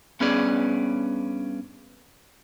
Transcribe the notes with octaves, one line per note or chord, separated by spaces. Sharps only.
G2 B3 C#4 G#4 B4 D5